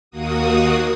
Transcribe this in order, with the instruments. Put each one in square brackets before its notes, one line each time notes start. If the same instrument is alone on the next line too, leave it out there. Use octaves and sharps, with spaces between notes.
[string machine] D#2 A#3 F#4 D#6